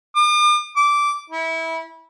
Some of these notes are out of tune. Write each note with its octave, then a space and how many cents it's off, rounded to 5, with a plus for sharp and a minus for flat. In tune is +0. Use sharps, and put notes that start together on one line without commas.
D6 +45
D6 -10
E4 -20